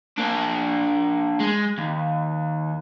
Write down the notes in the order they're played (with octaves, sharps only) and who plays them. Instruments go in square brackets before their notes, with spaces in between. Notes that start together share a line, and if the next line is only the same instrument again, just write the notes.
[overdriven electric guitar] A#3 D4
G#3
D#2